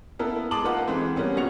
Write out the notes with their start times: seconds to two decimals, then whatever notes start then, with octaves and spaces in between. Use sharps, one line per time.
0.19 A#3 B3 E4 A4 A#4
0.51 G#3 A5 D6 D#6 F#7
0.63 A#3 D#4 F4 B4 F#5
0.88 E3 G#3 A3 C4
1.16 G3 A#3 B3 C#4
1.36 B1 A#2 F#4 C#7 F7